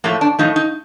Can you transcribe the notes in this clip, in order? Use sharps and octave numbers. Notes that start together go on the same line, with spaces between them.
A2 F3 A3 A#3
D4
A2 F3 A3 D#4
D#4